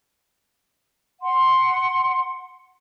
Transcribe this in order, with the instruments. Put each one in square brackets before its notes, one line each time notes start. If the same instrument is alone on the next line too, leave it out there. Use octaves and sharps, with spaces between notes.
[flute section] F#5 C6